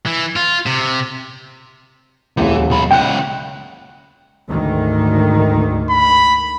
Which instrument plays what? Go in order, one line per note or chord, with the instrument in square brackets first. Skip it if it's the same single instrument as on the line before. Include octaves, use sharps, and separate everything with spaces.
[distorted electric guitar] E3
F4
C3
[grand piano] D#1 C#2 [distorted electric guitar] E3
[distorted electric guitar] B1 B5
[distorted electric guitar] C#2 F#5 [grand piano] G5
[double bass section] D2 G#2 D#3
[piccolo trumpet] B5